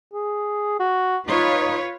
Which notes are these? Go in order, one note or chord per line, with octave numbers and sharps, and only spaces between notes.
G#4
F#4
D#4 F4 B4 C#5